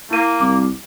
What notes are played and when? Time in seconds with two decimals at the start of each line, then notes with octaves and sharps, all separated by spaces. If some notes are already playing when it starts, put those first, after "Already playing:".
0.11 A#3 E4 D#7
0.41 C2 D6